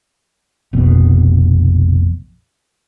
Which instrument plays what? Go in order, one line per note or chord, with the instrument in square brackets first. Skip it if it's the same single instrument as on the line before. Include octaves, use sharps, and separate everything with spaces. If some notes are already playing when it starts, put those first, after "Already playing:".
[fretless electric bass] F1 A#1 B2